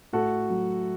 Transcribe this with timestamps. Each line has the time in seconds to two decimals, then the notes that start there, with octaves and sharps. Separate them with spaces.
0.13 A2 F#4 A4
0.50 F#3